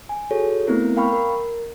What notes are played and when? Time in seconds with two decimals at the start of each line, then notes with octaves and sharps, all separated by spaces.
0.09 G#5
0.31 F#4 G#4 A4 C#5
0.67 A3 B3 C4 E4 A#4
0.96 A#4 F5 G5 B5 C#6 F6
1.13 A#4